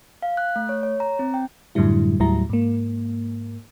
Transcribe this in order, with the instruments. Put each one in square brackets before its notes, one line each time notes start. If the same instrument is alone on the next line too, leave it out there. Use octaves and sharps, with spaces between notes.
[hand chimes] F5
F#6
A3
C#5
C#5
A#5
C4
G5
[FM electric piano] F#2 A2 D3 F#3 G3 E4
D#2 A2 F#3 G3 E4 A#5
G#2 A#3